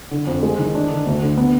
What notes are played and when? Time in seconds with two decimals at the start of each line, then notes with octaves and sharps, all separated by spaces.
0.11 D3
0.27 F2
0.43 G#3
0.59 D#3
0.75 D4
0.91 D3
1.06 D2
1.22 D3
1.37 B3